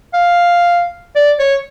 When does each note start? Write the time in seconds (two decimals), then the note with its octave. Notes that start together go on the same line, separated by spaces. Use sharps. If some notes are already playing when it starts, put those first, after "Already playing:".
0.13 F5
1.15 D5
1.39 C#5